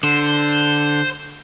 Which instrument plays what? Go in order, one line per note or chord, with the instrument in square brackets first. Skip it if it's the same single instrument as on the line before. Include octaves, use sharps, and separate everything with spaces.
[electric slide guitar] D3 [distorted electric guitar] C5